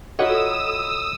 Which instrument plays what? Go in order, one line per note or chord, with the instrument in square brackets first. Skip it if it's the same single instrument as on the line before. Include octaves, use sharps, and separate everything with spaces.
[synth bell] F4 F#4 A4 [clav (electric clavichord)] C#5 D#5 F#5 [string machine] D#6 E6